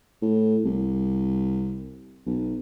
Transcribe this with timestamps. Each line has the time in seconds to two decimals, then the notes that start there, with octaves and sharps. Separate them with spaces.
0.22 A2
0.65 C2
2.27 B1